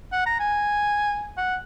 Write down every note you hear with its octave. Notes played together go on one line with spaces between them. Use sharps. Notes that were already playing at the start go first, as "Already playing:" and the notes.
F#5
A#5
G#5
F#5